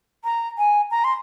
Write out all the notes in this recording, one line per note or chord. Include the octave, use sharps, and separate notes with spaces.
A#5
G#5
A#5
C6